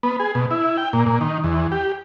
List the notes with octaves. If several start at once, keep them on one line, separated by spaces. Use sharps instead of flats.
B3
G#4
B2
E4
G5
A#2
A#2
D#3
E2
G4